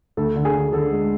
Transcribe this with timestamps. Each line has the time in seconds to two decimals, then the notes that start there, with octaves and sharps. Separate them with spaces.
0.17 D2 A4
0.36 D3
0.45 G#4
0.54 D3
0.73 D3 A4
0.92 G#3